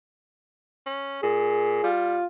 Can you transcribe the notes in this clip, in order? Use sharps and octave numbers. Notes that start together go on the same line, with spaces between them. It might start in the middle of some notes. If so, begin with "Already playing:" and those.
C#4
A#2 G#4
G3 F4